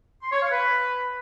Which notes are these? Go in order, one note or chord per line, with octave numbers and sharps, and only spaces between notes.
C6
C#5
F5
B4